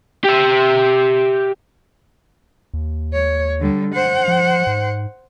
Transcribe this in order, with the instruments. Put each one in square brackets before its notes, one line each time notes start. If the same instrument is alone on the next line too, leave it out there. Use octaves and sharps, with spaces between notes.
[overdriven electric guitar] G4 E5
[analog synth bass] D#2
[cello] C#5
D3 G3
C5 F#5
[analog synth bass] F3
G#2